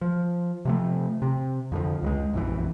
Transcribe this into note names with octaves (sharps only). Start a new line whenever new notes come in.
F3
C3 F3 A3
C3
F2 D3 F3
C#2 F#3 G#3
A#1 F#2 C#3 E3